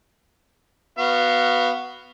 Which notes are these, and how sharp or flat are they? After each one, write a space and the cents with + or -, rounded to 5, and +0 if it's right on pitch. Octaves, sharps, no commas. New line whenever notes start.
B3 +0 F#4 +5 F5 -15